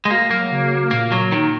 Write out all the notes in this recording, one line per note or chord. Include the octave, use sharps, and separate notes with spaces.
G#3
A#3 F#4
F#3 A#3
F#3
C#3
A#2 A#3
F#3
D#3